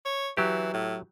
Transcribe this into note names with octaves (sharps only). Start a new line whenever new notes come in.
C#5
E3 F#3 G4
A2